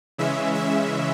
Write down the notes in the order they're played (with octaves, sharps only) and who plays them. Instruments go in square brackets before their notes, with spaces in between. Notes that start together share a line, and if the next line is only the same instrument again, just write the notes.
[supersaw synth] C#3 E3 G#3 C#4 E5
E5